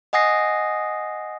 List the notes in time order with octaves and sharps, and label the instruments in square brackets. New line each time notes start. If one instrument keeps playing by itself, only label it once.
[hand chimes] D#5 F#5 G#5 D#6 A#6 C7